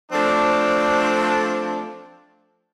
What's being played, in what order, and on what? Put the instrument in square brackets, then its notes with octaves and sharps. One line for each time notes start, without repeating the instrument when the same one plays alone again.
[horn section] F3 A3 C4 D4